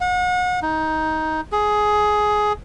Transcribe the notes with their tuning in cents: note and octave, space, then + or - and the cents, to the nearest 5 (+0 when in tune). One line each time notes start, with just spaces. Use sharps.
F#5 -35
D#4 +15
G#4 +15